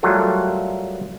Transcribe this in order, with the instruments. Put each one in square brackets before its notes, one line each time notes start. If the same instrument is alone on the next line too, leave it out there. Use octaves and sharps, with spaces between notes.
[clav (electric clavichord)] F#3 G3 A3 F4 A4 A#4